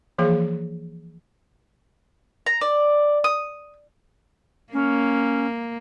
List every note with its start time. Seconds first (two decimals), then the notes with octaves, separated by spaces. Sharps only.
0.18 E3 F3 A#3 G#4 F5
2.46 A#5
2.61 D5
3.24 D#6
4.73 A#3 C#4